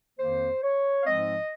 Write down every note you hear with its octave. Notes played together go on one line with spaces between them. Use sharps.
F2 D#3 A#3 C5
C#5
F5
G#2 F3 G#3 C4 D#5